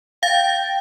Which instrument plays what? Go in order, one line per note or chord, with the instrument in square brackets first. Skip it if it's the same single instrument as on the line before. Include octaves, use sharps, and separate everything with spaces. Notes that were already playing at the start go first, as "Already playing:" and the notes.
[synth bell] F5 A6 [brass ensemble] G5